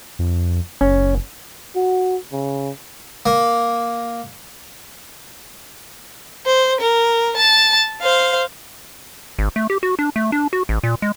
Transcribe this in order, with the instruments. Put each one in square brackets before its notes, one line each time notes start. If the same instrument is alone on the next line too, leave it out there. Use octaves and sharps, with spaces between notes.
[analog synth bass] F2
[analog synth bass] F#1 [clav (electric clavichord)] C#4
[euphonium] F#4
C#3
[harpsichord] A#3
[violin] C5
A#4
A5
C5 F5
[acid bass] G#1
A3
G4
F#4
D4
A3
D4
F#4
A1
A#2
G#3